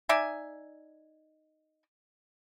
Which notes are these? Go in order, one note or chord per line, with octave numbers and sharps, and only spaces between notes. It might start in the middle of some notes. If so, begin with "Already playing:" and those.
D#4 D5 E5 G#5